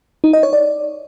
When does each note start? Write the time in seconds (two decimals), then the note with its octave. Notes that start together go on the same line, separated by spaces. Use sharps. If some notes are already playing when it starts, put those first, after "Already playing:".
0.24 D#4
0.33 D#5
0.43 C#5
0.53 D5